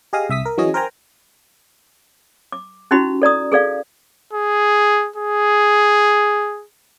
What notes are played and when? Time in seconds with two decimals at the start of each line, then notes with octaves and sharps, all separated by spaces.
0.13 G4 G#4 D#5 F5 D#6
0.30 C2 E5 D#6 B6
0.46 A#4
0.58 E3 F#3 C#4 G#4 D#5
0.74 A#4 C5 G5 G#5 A#5
2.52 D6
2.91 C#4 D#4 E4 F#4 G4 B5
3.22 A4 D5 A#5 D#6
3.52 G#4 A4 D5 F5
4.33 G#4
5.16 G#4